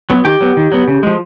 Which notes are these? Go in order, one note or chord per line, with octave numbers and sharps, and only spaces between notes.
F#3 B3
D#3 G4 G5
F#3 B3
D#3
F#3 B3
C#3
F3 G#3